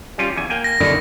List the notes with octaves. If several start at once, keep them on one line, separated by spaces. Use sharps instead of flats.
G3 C#4 F4
E2 G#5
A#3 G5 G#5
A#6
B2 D3 D#3 E4